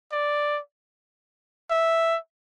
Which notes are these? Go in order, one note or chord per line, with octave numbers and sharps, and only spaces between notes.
D5
E5